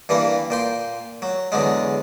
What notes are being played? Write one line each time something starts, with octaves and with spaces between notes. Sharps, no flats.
G2 E3 G3 A#3
A#2 G5 C6
F#3
E2 D3 F#3 G#3